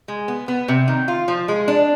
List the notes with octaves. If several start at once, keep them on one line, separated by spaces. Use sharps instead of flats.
G#3
B3
B3
C3
D#3
F4
F3
G#3
D4